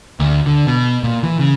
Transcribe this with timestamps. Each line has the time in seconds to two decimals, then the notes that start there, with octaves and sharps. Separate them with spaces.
0.20 D2
0.46 D3
0.67 B2
1.04 A#2
1.23 E3
1.39 C#3